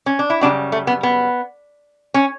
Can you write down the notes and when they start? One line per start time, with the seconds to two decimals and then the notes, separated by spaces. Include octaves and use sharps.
0.06 C#4
0.19 D4
0.30 E4
0.41 F#2 C#3 G3 D4 F#4
0.72 A3
0.87 B3
1.03 B3
2.14 C#4